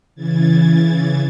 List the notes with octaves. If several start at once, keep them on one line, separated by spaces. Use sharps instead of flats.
C#3 E3 G#6 A6